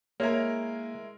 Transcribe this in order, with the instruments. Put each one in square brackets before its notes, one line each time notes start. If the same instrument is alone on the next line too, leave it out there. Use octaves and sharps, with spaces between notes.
[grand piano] G#3 E4 A#4 [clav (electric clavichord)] A#3 [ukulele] C#5